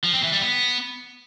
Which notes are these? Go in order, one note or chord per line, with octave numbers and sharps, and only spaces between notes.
F3
C4
E3
G3
B3